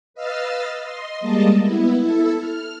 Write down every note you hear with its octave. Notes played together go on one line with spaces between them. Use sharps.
B4 D#5 F5 E6 F6 A6
D#5 C6
G3 G#3 A#3 D#5 A5
B3 E4
E4 A4
F6